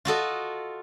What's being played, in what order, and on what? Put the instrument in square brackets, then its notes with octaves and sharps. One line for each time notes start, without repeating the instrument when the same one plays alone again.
[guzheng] F4 F#4 A4 D#5